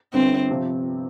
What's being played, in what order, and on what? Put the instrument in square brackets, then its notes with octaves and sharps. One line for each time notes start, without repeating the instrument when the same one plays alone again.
[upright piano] G1 G2 D3 [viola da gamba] C4
[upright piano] C3 F3 C4